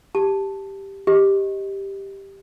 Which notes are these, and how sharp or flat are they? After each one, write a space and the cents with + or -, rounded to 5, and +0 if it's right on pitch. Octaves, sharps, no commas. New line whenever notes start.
G4 +0 A5 +0
G4 +0 D#5 +5